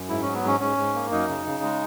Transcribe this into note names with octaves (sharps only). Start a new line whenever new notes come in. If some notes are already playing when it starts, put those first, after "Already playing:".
Already playing: F#2
G#2 E4
F#3 C#4
B3
G#2 C#4
G#2 C#4
G#2
A#3
F#2 D#4
C#3
C#3
G#3